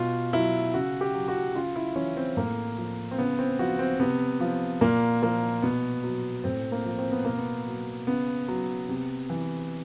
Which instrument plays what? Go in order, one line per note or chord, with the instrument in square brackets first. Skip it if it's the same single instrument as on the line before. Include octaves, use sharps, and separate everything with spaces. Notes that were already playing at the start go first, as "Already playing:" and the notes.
Already playing: [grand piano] B2 F4
F#3 E4
C#3 F#4
G4
F#3
F#4
C#3 F4
E4
E3 C#4
C4
A2 A#3
F3
C4
C#3 B3
C4
F3 F#4
C4
C3 B3
F3
A#2 A#3
F3 A#3
B2 B3
F#3
A2 C4
A#3
F3
C4
B3
B2 A#3
B3
F#3
C#3 B3
F#3
C3
E3